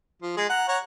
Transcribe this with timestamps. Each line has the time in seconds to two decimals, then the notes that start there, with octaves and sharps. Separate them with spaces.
0.22 F3
0.37 G#3 G#4
0.49 F#5 A#5
0.68 C#5 F#5 A#5